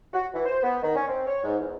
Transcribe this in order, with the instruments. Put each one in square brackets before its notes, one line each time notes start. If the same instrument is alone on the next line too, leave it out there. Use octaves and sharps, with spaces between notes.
[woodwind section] F#4
E3
C5
B3
D#3
C#4
C4
C#5
G#2
E2